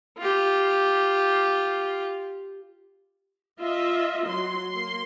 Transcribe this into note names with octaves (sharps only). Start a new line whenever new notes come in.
F4 G4
F4 D#5 E5
F#3 C6
A#3 C6